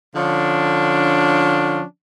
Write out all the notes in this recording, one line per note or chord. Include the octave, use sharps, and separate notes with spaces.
D3 F3 C#4 D4